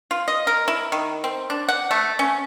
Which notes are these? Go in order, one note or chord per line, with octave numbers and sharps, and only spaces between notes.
F4
D#5
A#4
E4
D#3
C4
D4
F#5
A3
C#4